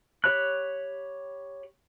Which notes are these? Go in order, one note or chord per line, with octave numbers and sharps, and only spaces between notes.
G4 C#5 B5 F#6